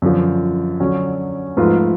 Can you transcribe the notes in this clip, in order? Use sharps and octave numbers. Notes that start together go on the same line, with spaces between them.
F#2 D3 F3
D3 F#3 C#4
G#2 F3 A3 F4 B4